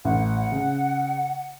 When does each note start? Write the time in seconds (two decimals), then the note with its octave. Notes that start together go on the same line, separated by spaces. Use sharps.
0.05 A1 F#5
0.52 C#3